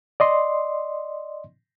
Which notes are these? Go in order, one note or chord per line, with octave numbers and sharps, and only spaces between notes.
D5 D#5 C6